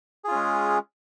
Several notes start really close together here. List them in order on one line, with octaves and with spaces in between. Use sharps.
G#4 F4 C#4 G#3